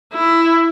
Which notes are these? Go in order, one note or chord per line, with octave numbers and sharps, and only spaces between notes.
E4